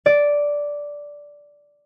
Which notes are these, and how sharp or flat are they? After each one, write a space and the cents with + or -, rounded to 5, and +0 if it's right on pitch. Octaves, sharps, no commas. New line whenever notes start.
D5 -5